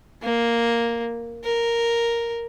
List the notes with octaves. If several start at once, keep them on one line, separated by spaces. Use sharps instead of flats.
A#3
A#4